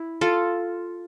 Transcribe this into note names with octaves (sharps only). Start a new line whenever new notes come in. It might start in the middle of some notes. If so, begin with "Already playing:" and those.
Already playing: E4
F4 A4